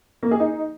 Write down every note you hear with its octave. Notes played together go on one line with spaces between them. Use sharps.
A#3
G#4
D#4